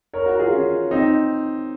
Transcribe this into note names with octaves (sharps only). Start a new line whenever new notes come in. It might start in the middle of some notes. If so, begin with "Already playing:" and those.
A#4 C#5
F#4 A#4
F4 G#4
C#4 F4
C4 D#4